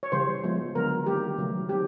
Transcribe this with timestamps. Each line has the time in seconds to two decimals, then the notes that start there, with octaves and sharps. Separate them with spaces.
0.03 C#5
0.12 C#3 E3 G3 C5
0.44 F3 G#3 B3
0.75 D3 F#3 B3 A#4
1.06 D#3 G3 A#3 G4
1.38 C#3 F#3 A3
1.69 D#3 G3 C4 G4